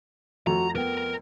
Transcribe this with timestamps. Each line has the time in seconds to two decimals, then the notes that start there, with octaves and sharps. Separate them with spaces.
0.47 F2 F3 A3 F#4 A#5
0.76 B3 A#4 G5